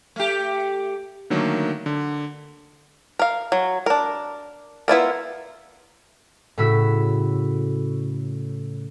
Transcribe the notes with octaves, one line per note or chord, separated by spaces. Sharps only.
A3 G4
D3 D#3 F#3 A3 A#3
D3
A#4 F5
F#3
D4 A#4
B3 E4 F4 A#4
A2 C#3 F#4 B5 E6 B6